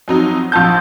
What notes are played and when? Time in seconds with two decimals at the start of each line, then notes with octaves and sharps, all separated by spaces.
0.08 F2 F#3 D#4
0.52 A#1 F3 A5 G6